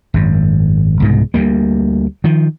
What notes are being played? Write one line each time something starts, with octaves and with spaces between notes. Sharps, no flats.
G#1 F#2
C2 G#2 B2
D2 G3 A#3
D#3 F3